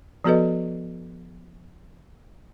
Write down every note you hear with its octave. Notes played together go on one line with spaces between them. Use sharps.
F3 B3 F#4 A4 B4 D#5